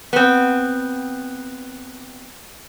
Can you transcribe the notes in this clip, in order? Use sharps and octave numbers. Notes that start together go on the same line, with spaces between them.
B3 C4